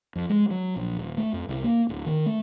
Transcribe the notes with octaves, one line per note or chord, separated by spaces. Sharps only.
F2
G#3
F#3
A#1
D#1
A3
F2
C2
A#3
D1
D#3
A3